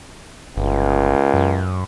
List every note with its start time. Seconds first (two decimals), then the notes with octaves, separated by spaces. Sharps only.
0.57 G1 C#2
1.34 F#2